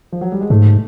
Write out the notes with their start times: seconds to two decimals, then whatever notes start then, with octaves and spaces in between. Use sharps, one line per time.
0.12 F3
0.21 F#3
0.32 G3
0.41 G#3
0.50 G#2 A3